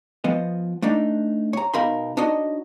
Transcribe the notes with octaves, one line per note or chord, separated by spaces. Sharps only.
F3 B3 D#5
A3 D4 D#4
C#5 A#5
B2 D#4 A#4 F5 B5 C6
D4 D#4 F#4 C#5 D#5